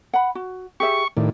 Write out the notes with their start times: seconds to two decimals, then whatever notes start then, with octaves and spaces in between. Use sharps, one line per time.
0.13 F#5 B5
0.35 F#4
0.80 G4 G#4 E5 C#6
1.17 A2 D#3 D5